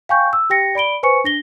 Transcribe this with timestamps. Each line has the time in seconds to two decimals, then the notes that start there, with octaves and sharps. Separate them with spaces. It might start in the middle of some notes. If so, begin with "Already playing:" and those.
0.09 F5 G5 G#5 C#6 G6
0.33 E6
0.50 G4 G5 A#6 C#7
0.75 D5 B5 D7 G7
1.03 B4 C5 G#5 C#6 C#7
1.24 D4 A#6 G7